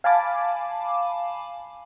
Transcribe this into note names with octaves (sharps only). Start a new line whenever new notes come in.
F5 G#5 A5 B5 D6